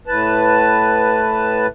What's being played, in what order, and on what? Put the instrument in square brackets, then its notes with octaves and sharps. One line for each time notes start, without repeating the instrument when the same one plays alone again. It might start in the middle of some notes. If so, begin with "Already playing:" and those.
[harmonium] A2 B4 A5